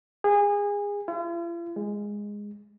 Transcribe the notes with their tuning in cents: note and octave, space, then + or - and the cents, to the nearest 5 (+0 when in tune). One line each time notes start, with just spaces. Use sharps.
G#4 -25
F4 -45
G#3 -10